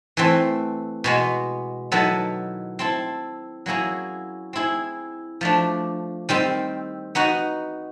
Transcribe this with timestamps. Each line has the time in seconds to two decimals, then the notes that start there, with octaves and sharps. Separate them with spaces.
0.17 E3 A3 C4
1.04 B2 G#3 B3
1.92 D#3 F#3 B3 E4 A4
2.79 C4 E4 A4
3.66 F#3 A#3 C#4 E4 G#4
4.53 C4 E4 G#4
5.41 F3 A3 D4
6.29 D#3 G3 C4
7.15 B3 D#4 F#4